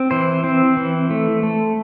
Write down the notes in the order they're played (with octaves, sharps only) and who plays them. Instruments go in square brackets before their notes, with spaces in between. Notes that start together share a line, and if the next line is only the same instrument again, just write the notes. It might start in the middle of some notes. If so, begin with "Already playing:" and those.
Already playing: [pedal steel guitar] C4
E3 C5
C4
E3
A3
A3